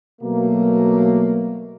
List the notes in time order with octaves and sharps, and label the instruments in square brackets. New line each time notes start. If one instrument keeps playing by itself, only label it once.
[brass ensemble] B2 F#3 A3 A#3